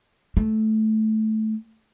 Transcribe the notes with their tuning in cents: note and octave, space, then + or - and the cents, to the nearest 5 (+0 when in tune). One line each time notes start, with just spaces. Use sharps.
A3 -10